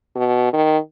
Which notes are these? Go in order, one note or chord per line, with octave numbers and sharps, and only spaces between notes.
B2
D#3